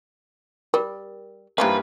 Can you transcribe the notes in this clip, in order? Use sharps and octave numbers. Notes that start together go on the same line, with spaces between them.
G3 A#4
G2 E3 F3 G3 A#3 D#4 B4